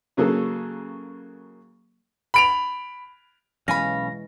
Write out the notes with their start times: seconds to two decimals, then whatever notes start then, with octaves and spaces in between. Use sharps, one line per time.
0.17 C#3 F#3 A#3 G#4 A4
2.34 B5 D7 F7
3.68 B1 E3 G#3 C#4 F5 G#5 B5 A#6